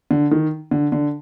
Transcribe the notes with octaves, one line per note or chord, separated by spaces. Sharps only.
D3
D#3
D3
D3